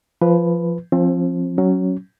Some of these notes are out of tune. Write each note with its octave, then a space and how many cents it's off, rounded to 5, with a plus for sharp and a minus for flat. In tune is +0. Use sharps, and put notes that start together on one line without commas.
F3 -15 B4 +0
F3 +0 C4 +30
F#3 +10 C#4 +0